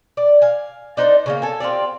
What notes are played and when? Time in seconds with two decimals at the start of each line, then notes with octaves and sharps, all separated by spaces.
0.17 D5
0.42 F5 G#5
0.97 D4 D#4 C5 D5
1.26 C#3 G#3 A#3
1.42 A4 G#5
1.60 C4 F4 G4 D5